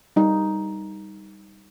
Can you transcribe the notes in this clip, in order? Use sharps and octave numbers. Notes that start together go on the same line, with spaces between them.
G3 D#4